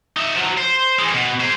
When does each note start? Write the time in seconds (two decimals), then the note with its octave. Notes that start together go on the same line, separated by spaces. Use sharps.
0.17 D#4 E5
0.36 F3 F#3
0.58 C5
0.99 E3 G#3
1.14 B2
1.41 G#4 C5